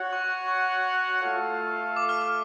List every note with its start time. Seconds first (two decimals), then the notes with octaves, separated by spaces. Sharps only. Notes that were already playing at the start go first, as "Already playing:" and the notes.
Already playing: F#4 C#5 F#5
0.13 C#6
0.48 C#6
1.22 A3 F4 A4 F5
1.96 D6
2.09 F6
2.22 D6